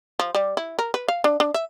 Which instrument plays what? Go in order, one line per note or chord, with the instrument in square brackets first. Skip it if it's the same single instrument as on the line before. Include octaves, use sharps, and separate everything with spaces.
[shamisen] F3
G3
E4
A#4
B4
F5
D4
D4
E5